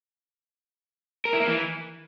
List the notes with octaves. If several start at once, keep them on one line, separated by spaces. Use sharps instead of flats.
A#4
E4
A#3
E3